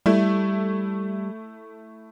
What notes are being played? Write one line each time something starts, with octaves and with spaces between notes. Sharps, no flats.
G3 A3 E4